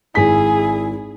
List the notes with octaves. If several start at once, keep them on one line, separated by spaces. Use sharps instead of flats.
G#1 E4 G#4 B6